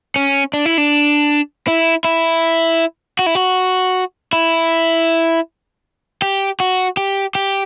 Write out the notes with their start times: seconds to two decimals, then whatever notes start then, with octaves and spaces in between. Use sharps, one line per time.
0.16 C#4
0.54 D4
0.66 E4
0.78 D4
1.68 E4
2.04 E4
3.19 F#4
3.26 E4
3.35 F#4
4.33 E4
6.22 G4
6.60 F#4
6.97 G4
7.35 G4